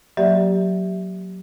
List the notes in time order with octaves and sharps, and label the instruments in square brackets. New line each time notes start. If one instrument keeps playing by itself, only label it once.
[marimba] F#3 A#3 G4 D5 E5